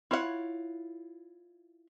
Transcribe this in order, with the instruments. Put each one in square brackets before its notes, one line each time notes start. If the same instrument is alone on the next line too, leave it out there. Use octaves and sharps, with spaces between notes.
[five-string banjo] E4 F4 C#5 E5 F#5